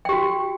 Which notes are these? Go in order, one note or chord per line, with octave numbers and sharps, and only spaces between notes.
F#4 G4 G5